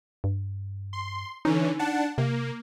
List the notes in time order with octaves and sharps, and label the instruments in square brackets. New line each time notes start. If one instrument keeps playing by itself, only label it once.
[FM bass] G2
[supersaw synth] C6
[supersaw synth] D3 E3 C#4 [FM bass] D#4
[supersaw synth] D4 F#5 A5
[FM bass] C3 [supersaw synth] A#3